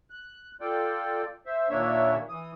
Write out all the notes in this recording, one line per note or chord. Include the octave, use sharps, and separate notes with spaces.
F#6
F4 A4 D5 G5
C5 E5
D#2 A#2 A#3 D4 C#5 E5
E3 D#6